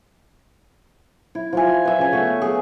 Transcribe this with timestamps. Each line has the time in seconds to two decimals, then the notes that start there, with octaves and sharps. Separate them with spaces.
1.35 E4
1.53 F3 F4 G#5
1.85 B4 E5
1.99 C#3 G#5
2.12 A3 B3 C#6
2.42 G#4